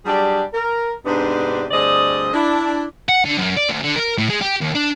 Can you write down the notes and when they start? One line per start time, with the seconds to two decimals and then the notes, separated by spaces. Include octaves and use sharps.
0.05 F#3 G3 D4 G4 G#4 D5
0.54 A#4
1.06 G#2 C3 B3 D4
1.71 D2 G2 C4 G#4 D5 D#5
2.33 D4 E4
3.09 F#5
3.25 D3
3.37 F#2
3.57 D5
3.69 D2
3.83 D3
3.96 A#4
4.18 A2
4.30 G#3
4.41 G4
4.61 D#2
4.75 D4